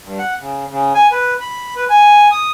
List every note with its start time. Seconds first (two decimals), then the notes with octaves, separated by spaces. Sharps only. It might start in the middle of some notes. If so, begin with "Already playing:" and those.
0.04 G2
0.19 F#5
0.40 C#3
0.70 C#3
0.95 G#5
1.11 B4
1.40 B5
1.76 B4
1.90 G#5
2.32 D#6